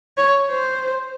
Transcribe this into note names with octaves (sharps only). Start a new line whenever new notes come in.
C#5
C5